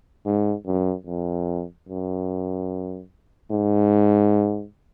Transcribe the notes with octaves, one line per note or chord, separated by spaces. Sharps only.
G#2
F#2
F2
F#2
G#2